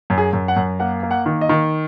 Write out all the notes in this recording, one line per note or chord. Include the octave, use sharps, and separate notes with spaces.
F#2
G#4
F#2
F#5
F#2
A#3 F#5
A#3
F#5
D#3
D#5
D#3